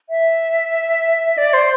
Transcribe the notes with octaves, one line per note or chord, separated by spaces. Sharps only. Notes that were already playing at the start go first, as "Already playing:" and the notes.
E5
D5
C5